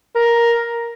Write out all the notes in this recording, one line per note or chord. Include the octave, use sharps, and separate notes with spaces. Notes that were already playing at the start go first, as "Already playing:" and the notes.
A#4